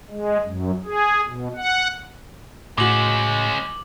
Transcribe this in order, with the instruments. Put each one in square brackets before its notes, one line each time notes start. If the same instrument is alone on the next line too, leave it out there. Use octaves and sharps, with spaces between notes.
[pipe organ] G#3
F#2
G#4
B2
F#5
[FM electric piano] A2 F#4 [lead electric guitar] G#3 C#4 [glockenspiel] D6 F#7